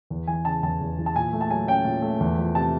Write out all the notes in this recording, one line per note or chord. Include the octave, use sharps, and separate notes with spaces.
E2
E3 G#5
C#3 A5
E2 A5
E2
E3
A5
A#2 G#5
A3
A5
F#3 G#5
C#4 G5
A#2
A3
E2
F3
C3 A5